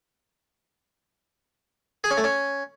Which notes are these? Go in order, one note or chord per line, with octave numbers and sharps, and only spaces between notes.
G#4
C#4
A3
C#4